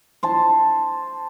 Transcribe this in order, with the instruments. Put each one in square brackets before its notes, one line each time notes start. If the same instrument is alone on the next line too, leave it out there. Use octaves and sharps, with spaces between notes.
[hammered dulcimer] C5 A5